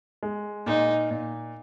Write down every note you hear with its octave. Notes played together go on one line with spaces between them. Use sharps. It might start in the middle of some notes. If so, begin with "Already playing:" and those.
G#3
A#2 D#4
A#2